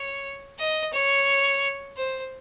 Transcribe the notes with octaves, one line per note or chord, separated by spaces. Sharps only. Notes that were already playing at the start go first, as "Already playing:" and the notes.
Already playing: C#5
D#5
C#5
C5